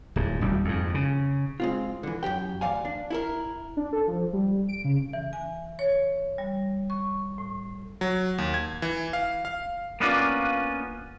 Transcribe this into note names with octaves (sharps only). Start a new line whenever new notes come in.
D1 G#2
D#1 D2 G3
F2 G#2
C#3
G#3 C4 F4
D3 E3
F#2 C#3 G4 G5
D2 G2 E3 D5 F5 G#5
D4
E4 A4 A#4
D4
A4
F3
G3
D7
C#3
E3
G#5
C#5
G3
C#6
A2
F#3
D#2
G#6
E3
F5
F5
A#3 B3 C#4 D4 F4